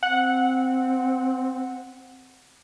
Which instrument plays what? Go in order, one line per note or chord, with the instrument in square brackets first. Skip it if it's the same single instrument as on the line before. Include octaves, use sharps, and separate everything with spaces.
[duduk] C4 [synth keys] F#5